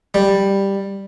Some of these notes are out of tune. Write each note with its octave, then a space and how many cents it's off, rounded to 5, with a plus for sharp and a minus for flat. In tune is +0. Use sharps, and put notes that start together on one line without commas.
G3 +5